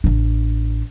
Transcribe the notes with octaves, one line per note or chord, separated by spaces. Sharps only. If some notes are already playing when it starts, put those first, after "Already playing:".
A1 D4